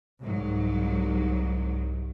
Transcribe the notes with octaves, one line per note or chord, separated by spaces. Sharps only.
C2 G#2 F#3